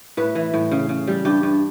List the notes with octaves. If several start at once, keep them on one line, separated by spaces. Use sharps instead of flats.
A2 B4
E3
A2
C#3
C#3
G3
G2 G4
G2